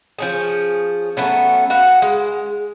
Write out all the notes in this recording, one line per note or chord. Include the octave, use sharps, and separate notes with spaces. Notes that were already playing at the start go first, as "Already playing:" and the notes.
F3 C#4 G#4
F#3 A3 B3 C#4
B3 F#4 F5
G#3